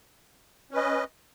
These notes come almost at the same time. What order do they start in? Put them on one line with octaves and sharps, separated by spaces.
C#4 B4 D#5